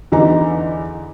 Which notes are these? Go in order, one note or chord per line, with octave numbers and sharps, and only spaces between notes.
E2 D3 E3 D#4 A#5